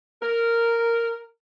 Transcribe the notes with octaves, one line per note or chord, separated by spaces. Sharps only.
A#4